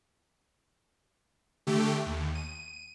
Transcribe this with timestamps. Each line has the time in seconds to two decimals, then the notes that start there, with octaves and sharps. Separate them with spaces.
1.67 D3 A3 G4
2.06 D#2
2.35 D#7